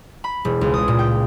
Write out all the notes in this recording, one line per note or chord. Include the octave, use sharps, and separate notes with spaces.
B5
E1
C#2
D#6
A#2
G5